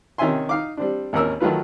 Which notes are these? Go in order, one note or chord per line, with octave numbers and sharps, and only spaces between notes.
C3 D#3 C#4 E5 G#5 C6
D#4 F5 D6
G3 C4 D4
G#1 D#2 C#4 A#4 E6
D#3 F#3 A3 F4 B4